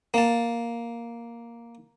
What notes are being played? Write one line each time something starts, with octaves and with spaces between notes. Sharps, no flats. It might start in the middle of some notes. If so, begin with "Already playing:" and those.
A#3 A5